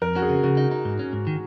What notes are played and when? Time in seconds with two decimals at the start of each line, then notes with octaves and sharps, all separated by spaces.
0.02 F2 A#4
0.15 C#4 F#4
0.22 G#4
0.29 C#3
0.43 C#3 F#4
0.57 D#4
0.71 D#4
0.85 G#2
0.99 C#4
1.13 G#2
1.27 D#3